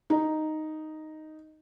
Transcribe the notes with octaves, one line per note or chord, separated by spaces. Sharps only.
D#4